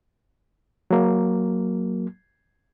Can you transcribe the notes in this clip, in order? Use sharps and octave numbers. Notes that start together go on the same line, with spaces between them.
F#3 A#3